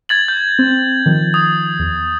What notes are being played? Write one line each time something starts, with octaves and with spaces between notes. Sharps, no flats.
G#6 A6 F#7
G6
C4
D#3 F3
D#6
E2